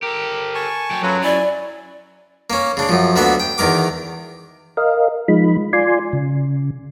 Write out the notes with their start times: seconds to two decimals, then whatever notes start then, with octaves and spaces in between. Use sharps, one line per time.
0.02 G4 A4 A#4
0.55 G#5 A5 C#6
0.91 F#3 G5
1.03 F#3 C#4 F4 F#4 A4 B4
1.24 E4 D5 G#5
2.50 A#3 C#4
2.77 C#3 D4
2.89 F#2 F3
3.16 D2 D3 A#3 B3 E5 B5
3.40 G5
3.58 E2 D#3 A#4 D6
4.77 A#4 D#5 F5
5.28 F3 G#3 D#4 B5
5.73 F4 D5 G#5 C6
6.13 C#3